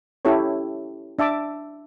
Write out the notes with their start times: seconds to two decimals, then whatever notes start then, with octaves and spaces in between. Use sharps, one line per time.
0.25 C#4 E4 G4 A4 C#5
1.19 D4 E5 A5 D6